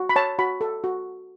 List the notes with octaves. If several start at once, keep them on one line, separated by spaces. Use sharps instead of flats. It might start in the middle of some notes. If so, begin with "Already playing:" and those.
Already playing: F#4
B5
C#5 A5
F#4 B5
A4
F#4